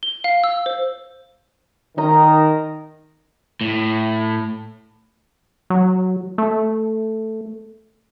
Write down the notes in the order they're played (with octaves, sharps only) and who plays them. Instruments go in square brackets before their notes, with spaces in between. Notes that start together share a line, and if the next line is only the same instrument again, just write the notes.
[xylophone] G7
F5
E6
C5
[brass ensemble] D#3 [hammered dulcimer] D#5 A#5
[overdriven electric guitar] A2
[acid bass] F#3
A3